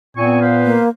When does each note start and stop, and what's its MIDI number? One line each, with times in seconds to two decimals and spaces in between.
0.17 0.77 46
0.17 0.80 59
0.17 0.38 60
0.17 0.38 80
0.17 0.38 85
0.41 0.83 71
0.41 0.83 72
0.41 0.83 77
0.65 0.89 58